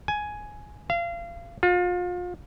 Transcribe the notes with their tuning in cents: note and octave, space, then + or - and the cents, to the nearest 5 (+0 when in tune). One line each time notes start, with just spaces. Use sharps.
G#5 +10
F5 -30
F4 +35